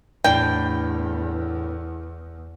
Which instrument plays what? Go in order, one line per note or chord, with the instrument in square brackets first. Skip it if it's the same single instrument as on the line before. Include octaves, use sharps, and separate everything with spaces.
[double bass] E2 [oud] A2 D4 [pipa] G5